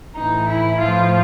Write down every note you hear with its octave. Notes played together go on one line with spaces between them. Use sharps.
A2 E3 D#4
E4
A2 F3 F4